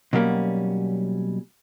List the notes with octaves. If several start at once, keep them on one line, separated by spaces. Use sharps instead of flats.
B2 F#3 G3 A#3 C#4